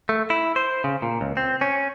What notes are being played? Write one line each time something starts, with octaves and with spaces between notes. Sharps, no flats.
A3
E4
C5
C#3
A#2
C#2
C4
C#4